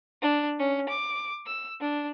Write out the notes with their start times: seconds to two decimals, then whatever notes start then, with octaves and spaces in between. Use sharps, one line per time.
0.22 D4
0.59 C#4
0.89 D6
1.46 E6
1.81 D4